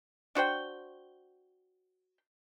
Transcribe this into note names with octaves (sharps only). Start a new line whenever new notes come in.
D4 F#4 C5 G5